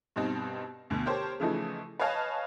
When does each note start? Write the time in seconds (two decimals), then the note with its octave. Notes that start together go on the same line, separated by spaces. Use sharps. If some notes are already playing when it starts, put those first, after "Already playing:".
0.16 G2 B2 C4 D#4
0.90 D2 B2
1.06 G4 A#4 C5 C#5 A5
1.40 C#3 E3 F3 A3 D#4
1.99 B4 C#5 D#5 F5 G#5 A5